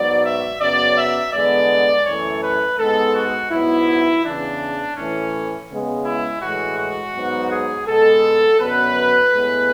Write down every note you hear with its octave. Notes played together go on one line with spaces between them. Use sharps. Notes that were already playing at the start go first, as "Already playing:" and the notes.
Already playing: G#2 F#3 B3 D5
E5
F#2 C#3 F#3 B3 D5
E5
E2 D3 G#3 B3 D5
F#2 E3 A3 C#5
B4
G#2 G#3 B3 A4
F#4
G#2 F#3 B3 E4
E2 C#3 E3 D4
A2 E3 A3 C#4
C#3 G#3 B3
E4
A2 E3 G#3 F#4
F#4
G#2 F#3 B3
G#4
B2 G#3 B3 A4
F#2 D3 F#3 B3 B4
A2 G#3 B3